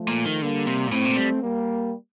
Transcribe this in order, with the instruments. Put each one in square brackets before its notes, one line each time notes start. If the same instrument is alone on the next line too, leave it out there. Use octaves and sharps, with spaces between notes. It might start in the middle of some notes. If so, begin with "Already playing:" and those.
Already playing: [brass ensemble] F3 A3
[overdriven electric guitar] A#2
D#3
[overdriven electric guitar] D3 [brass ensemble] G3 A#3
[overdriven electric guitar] C3
A#2
[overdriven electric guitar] A2 [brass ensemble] A3 C4
[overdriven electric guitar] A#2
G3
[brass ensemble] G3 A#3